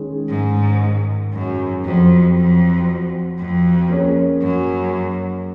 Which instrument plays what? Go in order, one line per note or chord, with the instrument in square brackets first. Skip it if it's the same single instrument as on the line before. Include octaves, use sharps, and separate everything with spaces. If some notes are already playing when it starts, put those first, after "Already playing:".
Already playing: [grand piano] D#3 G#3 C#4 G#4
[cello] G#2
F#2
[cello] F2 [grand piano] F#3 C4 F#4 C5
[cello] F2
F2
[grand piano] A#3 C#4 G#4 C#5
[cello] F#2